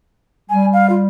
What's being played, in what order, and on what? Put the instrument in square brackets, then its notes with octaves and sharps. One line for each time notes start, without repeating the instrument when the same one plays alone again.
[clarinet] G3 [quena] G#5
[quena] F5
F4